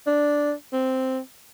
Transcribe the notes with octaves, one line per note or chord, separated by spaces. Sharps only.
D4
C4